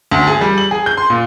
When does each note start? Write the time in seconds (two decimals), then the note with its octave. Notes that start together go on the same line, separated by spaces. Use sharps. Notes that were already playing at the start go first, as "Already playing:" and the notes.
0.11 D2
0.27 G#4
0.41 G3
0.58 F#7
0.71 G#4
0.86 G6
0.97 C6
1.10 A#2